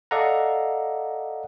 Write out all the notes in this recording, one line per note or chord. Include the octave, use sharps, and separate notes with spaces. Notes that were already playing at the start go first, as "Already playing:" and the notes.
A4 D5 D#5 F5 F#5 A#5